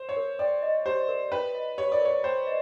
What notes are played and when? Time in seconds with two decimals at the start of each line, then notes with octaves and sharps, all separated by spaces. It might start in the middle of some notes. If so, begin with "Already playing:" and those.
Already playing: C5
0.09 C#5
0.17 A#4
0.39 D5 G5
0.62 D#5
0.86 G4 C5
1.08 A#4
1.32 B4 G5
1.55 D#5
1.78 G4 C#5
1.92 D5
2.01 A#4 C#5
2.24 C5 G5
2.47 D#5